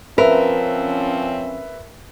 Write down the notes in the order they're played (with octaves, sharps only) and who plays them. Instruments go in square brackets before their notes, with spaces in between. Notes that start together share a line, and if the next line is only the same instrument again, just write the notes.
[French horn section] F3 C4 C#4 [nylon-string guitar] A#4 [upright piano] B4 E5